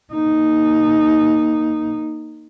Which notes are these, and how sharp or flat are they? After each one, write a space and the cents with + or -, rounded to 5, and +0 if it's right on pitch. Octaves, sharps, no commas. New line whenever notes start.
A#3 +0 D#4 +0